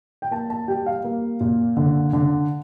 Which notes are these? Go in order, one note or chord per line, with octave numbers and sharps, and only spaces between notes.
G5
A#3 A5
A5
G3 G5
F5
A#3
A#2
D3
D3